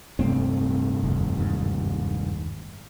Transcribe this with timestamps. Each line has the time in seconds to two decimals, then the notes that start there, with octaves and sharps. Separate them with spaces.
0.19 D1 G2 C3 A3 C4
1.03 F1 D#2
1.36 F#1 D#2 G#2